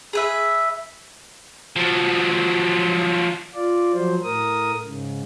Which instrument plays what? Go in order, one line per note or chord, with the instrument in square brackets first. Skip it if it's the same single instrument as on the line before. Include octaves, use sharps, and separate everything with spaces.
[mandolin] G#4 B4 E5
[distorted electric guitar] F3 F#3
[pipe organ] F4 D5
F3 F#3 C5
A2 A#4 D#6
G#2 C#3